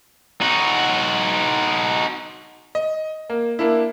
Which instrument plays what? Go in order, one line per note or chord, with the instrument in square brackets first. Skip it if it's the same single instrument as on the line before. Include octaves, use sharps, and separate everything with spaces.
[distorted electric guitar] D#4 F#4
[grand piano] D#5
A#3
A#3 D4 E4